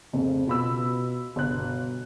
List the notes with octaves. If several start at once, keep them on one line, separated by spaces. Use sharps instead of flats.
F1 C#3 C4
B2 F4 B5 E6
G1 B2 F#6